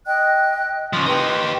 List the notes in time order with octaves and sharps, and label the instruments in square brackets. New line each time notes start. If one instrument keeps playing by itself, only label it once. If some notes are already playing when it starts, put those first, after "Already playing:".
[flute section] D#5 G5 F#6
[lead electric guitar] C#3 F3
[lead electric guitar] D#4 G4 [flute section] B4 C6